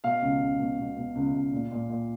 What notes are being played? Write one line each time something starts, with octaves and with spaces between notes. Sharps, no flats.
B2 F5
C#2
C#2
B2
B2
B2
C#2
C#2
A#2
A#2
A#2